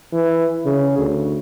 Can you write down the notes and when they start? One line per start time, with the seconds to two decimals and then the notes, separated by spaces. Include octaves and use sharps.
0.13 E3
0.66 C#3
0.98 D2